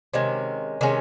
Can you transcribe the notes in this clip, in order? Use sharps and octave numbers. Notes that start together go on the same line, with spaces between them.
C3 D#3 G#3 C#4
C3 D#3 G#3 C#4